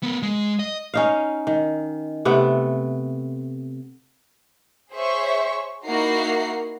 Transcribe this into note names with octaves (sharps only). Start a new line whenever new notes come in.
B3 A#4
G#3
D#5
C#4 D#4 F5
D#3
C3 A3 B3
G#4 C5 C#5 E5 C#6
A#3 D#4 E4 F#4 A#5 C7